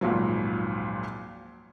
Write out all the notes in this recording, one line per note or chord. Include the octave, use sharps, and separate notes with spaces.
G#1 C#2 A#2 F3 F#3